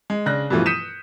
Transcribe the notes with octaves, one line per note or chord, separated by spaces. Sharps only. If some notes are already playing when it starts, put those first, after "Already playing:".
G#3
C#3 D4 F#6 A#6
G2 B2 E3 F3 A3 F4
D#6 G6 B6 C#7 D#7 E7